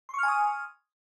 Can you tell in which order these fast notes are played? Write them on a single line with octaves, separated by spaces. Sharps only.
C6 C#6 F6 G#5 D#6